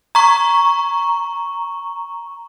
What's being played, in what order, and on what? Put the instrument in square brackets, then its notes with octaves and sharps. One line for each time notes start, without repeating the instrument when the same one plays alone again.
[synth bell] A#5 C#6